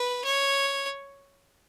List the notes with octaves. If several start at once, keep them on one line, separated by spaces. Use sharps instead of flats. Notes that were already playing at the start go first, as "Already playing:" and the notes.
Already playing: B4
C#5